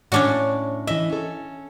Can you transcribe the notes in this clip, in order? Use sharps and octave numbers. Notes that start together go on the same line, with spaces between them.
A2 C#4 D4 F#4 D5
E3 D#5 E5
C#4 A4